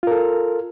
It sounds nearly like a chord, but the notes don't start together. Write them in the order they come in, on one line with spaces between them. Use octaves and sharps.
F4 A#4 A4